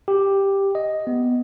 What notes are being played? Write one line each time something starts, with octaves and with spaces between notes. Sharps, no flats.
G4
D#5
B3